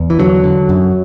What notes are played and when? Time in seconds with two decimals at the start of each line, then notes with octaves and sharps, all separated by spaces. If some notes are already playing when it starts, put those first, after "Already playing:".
Already playing: E2
0.10 E3
0.19 D3 F#3
0.44 D3
0.69 F#2